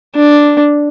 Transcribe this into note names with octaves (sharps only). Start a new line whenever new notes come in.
D4